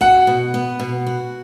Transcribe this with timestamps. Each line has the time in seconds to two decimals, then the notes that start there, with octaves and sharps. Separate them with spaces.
0.01 F#4 F#5
0.27 B2
0.54 B3
0.79 B2
1.07 F#4